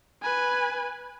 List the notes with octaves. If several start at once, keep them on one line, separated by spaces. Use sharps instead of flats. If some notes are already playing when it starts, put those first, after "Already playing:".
B4 G#5